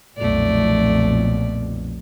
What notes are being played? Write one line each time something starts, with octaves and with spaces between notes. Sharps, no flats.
B1 F2 A#2 A3 D5